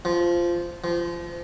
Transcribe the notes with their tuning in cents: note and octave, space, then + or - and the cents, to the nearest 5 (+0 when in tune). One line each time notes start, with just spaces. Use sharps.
F3 -10
F3 -25